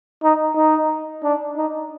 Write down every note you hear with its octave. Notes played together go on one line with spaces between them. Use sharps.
D#4
D#4
D4
D#4